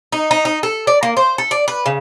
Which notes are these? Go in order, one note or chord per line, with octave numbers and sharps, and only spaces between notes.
D#4
D#4
D#4
A4
D5
A#3
C5
A4
D5
B4
C#3